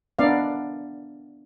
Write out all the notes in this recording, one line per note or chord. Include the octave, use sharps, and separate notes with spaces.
B3 D4 D#4 D5 E5 F5